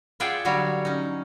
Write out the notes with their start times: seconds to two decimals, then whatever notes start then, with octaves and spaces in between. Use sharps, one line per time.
0.20 F4 G#4 D5 E5 F#5 G5
0.45 D3 F#3 G3 F#4 C#5
0.85 C#4 D#4